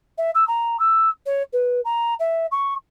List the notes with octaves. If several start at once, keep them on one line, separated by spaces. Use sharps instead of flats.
E5
E6
A#5
E6
C#5
B4
A#5
E5
C#6